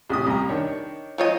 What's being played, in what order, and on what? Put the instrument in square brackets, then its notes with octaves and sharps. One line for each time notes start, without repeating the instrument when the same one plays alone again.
[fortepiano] A1 C3 D#6
C2 A#5
D#3 D4 C#5
[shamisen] F3 C#5 D#5